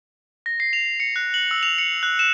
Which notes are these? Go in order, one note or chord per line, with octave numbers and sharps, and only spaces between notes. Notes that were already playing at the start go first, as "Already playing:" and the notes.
A#6
C7
F7
C#7
F#6
F#7
E6
F7
C#7
F#6
E7